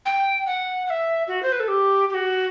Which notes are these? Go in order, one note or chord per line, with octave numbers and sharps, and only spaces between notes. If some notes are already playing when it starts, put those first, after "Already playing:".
G5
F#5
F#5
E5
F#4
C5
B4
A4
G4
G4
F#4